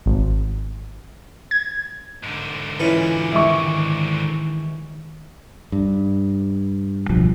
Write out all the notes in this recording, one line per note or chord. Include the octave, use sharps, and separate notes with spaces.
G#1
G#6
G#2 D3
E3 C#4 D4 F4 B4
D#3 G#3 E5 C#6
G2
D1 B1 G2 F3